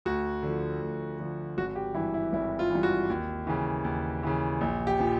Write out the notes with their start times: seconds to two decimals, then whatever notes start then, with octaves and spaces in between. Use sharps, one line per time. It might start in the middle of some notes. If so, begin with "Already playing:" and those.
0.05 D2 F#4
0.43 D3 F3
0.81 D2
1.19 D3 F3
1.58 G#1 F#4
1.76 G4
1.95 G2 E3 E4
2.14 E4
2.33 G#1 E4
2.59 F4
2.71 G2 E3
2.83 F#4
3.10 D#2
3.47 C#3 E3
3.85 D#2
4.23 C#3 E3
4.61 A#1
4.87 G4
4.99 A#2 F3